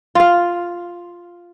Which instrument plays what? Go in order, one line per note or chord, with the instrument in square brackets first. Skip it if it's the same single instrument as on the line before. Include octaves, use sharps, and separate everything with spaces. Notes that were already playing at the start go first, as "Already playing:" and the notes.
[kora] F4 F5